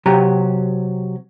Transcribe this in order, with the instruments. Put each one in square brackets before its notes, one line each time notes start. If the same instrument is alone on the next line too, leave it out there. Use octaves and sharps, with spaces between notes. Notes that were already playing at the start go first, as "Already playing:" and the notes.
[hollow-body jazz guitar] C3 F#3 G4 A#5